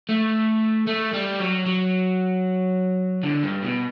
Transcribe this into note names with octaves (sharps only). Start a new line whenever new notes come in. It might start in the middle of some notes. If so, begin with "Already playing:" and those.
A3
A3
G3
F#3
F#3
D3
G2
B2